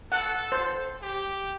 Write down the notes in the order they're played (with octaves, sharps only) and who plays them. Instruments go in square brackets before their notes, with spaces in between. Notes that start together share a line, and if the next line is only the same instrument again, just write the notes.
[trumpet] A4 [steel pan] F#5
[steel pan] C5
[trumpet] G4